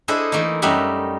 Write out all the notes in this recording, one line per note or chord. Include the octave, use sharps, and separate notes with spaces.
D4 E4 G#4 A4 C5 D#5
E3 A3 A#3 D#4
F#2 G3 A3 D#4 E5 F#5